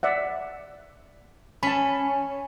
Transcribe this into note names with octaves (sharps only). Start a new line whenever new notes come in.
D5 E5 F#5
C#4 A5 B5